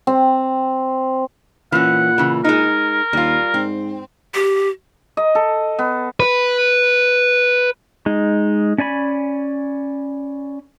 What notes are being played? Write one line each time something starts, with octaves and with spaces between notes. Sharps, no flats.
C4
A#2 E3 C#4 F#5
C#3 E3
G#3 D#4 A#4
D#2 G3 F4
G#2 C4
G4
D#5
A4
B3
B4
G#3 D#4
C#4 D5 G#5 B5